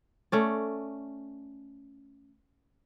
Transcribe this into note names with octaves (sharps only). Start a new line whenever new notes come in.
A3 C#4 D5